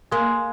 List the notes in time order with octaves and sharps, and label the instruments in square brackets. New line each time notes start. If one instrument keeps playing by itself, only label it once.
[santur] G#3 [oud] A#3